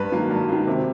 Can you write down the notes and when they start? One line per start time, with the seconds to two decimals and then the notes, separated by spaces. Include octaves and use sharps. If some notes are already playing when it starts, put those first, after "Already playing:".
Already playing: G2 B4
0.12 D#3 F#3 A#3
0.30 G2
0.49 D#3 F#3 A#3
0.67 C3